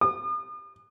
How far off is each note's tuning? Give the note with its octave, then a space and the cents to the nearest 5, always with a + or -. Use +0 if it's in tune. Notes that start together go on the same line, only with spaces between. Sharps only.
D#6 -45